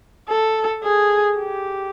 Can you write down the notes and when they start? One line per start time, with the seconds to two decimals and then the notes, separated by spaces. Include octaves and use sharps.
0.28 A4
0.83 G#4
1.38 G4